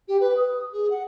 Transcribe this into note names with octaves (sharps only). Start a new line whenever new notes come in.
G4
B4
D#6
G#4
F#5